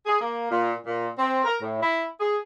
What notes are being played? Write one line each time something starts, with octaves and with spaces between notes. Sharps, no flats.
G#4
A#3
A#2
A#2
C4
A#4
A2
E4
G#4